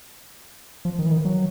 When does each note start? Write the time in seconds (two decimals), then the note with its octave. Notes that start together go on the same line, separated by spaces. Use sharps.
0.85 F3
0.99 D#3
1.06 E3
1.12 D#3
1.25 F#3